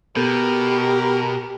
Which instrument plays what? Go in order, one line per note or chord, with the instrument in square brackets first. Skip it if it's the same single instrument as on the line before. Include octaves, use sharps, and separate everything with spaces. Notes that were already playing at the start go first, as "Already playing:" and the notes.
[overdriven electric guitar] B2 [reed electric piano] B3 A4 G6 [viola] G4 [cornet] A#4